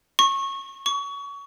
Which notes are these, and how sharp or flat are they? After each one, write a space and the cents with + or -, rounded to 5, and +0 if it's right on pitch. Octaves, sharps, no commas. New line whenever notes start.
C#6 -20
C#6 +25